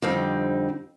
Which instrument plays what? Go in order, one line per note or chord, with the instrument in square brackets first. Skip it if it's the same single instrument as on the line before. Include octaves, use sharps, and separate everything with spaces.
[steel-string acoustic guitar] F2 D3 G3 C4 D#4